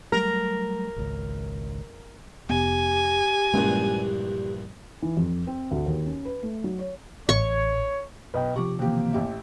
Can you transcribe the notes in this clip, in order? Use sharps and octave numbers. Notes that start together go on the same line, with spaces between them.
F#3 G3 A3 A#4
G#1 C#2
F1 B3 G4 G#5
A#1 E2 G2 G#3 A#3 C#4
E3
F2
C4
D2
D#2
C#4
B4
A3
F#3
C#5
A1 C#5 C#6
B1 B4 D#5 G5
C3 F3 G4 C#6 D6
B2 D#3 E3 A#3 C4 G4
A1 G4 E5